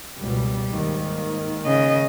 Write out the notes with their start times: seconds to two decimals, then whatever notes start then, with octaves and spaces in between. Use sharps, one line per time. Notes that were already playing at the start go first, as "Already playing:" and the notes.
0.18 F#1 C#2 B2 G3
0.71 D#2 G#2 D#3
1.66 C#3 D#5